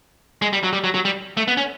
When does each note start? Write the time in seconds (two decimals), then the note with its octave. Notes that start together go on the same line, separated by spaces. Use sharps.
0.42 G#3
0.53 G3
0.63 F#3
0.73 G3
0.84 F#3
0.94 F#3
1.05 G3
1.37 A3
1.48 B3
1.57 C#4